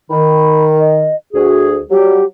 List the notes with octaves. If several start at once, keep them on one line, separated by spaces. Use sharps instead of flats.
D#3 B5
D#5
D2 F#4 G#4
F#3 G3 G4